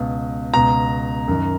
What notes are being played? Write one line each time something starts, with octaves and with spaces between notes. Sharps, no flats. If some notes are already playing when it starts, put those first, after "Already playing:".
Already playing: C#2 B2
C#2 B2 A#5
F#2 D#3